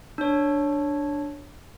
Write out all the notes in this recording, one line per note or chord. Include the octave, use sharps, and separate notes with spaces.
D4 C#5